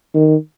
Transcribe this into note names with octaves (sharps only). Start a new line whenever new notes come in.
D#3